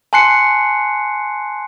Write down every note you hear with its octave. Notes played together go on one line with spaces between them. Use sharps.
G#5 A5 C6 F#6 C7 C#7